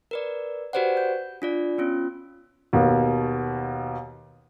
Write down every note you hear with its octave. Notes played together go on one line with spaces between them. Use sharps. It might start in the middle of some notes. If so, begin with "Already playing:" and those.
A#4 B4 D5
F#4 G4 B4 C5 D5 F#5
G6
D4 F4 D5
B3 C#4 F4
D#2 B2